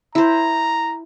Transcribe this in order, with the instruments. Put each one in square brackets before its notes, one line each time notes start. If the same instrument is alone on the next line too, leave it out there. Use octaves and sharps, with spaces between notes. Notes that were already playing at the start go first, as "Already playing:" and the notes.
[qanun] E4 C5 [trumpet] A#5